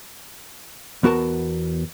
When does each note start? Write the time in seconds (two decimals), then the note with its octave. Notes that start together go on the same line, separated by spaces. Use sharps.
1.03 E2 B3 F#4 A#4 A5